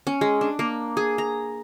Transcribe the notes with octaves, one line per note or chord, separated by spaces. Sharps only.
C#4
G#3
D4
A#3
G#4
A#5